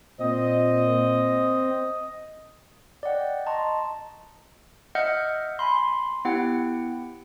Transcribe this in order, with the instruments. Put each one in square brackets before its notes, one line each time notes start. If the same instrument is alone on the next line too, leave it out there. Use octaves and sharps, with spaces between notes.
[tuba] A#2 [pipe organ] C4 [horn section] D#5
[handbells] D5 D#5 F#5 G5
D#5 A5 A#5 C6 C#6
D#5 E5 F#5 F6 G6 C#7
G#5 B5 C6
B3 E4 G4 F#5 G5